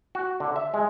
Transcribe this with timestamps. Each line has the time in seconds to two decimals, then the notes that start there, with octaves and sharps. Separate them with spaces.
0.15 F#4
0.40 D3
0.56 E5
0.74 G#3